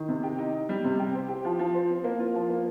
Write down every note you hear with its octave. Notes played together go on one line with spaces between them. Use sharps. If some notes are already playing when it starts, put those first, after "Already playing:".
Already playing: D#3
C3
G4
D#4
D#4
G3
C3
G4
C5
G4
F3
F3
C5
C4
A#3
F4
F3
A#3